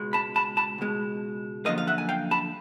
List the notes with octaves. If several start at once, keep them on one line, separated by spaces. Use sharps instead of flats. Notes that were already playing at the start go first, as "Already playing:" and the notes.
Already playing: C#2 B2 G#3
A5 B5
A5 B5
A5 B5
C#2 B2 G#3
F#2 D3 F3 A#3 D#5 F5
F5
E5 F#5
G#5
F5 G5
A5 B5